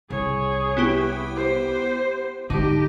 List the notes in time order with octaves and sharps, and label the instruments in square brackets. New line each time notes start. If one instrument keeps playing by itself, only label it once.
[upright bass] C2 [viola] G#4 C#5
[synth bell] B3 E4 G4
[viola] C5
[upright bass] G#2 G#3 [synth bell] D3 D#4 A#6 [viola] G4